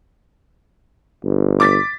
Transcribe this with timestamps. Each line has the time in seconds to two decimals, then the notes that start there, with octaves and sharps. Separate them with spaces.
1.24 G1
1.60 D6 A6 B6